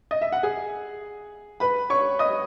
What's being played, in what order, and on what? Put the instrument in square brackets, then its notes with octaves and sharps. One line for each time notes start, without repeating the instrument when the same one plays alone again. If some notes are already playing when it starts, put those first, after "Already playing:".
[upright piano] D#5
E5
F#5
G#4 G#5
B4 B5
C#5 C#6
D#5 D#6